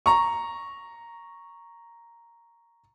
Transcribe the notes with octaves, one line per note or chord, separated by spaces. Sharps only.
A#5 C#6